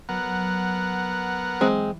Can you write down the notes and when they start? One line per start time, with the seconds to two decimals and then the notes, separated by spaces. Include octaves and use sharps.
0.09 F#3 B3 A#4 F#5
1.61 E3 G#3 C4